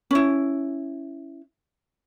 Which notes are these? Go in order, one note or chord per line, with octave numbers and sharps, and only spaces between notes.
C#4 E4